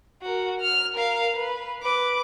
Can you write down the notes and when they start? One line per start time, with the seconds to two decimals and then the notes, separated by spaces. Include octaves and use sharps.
0.22 F#4 A#4
0.61 F6
0.95 A#4 F5
1.36 B4
1.82 B4 D6